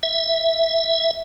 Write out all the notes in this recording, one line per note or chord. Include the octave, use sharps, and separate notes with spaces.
E5